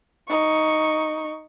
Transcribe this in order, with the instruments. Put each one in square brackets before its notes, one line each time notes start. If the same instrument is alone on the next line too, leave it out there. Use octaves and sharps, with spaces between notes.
[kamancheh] D#4 C#6